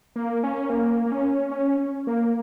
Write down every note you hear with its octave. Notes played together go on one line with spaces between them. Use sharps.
A#3
C#4
A#3
A#3
C#4
C#4
A#3